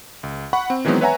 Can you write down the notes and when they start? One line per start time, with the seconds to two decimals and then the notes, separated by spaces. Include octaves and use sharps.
0.23 C#2
0.53 F#5 B5 C#6
0.70 C4
0.85 D#3 E3 F#3 G#3 B3 C4
1.01 B4 C#5 E5 F#5 G#5 A#5